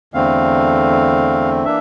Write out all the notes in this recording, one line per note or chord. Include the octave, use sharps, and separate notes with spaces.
E2 D3 A3 C4 F5
E3 A#3 D4 E5